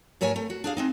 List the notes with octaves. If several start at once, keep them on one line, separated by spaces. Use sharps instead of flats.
G#2 A3 A#4 C#5 G#5
A3
F#4
D4 G#4 F5
G#3 C4 D#4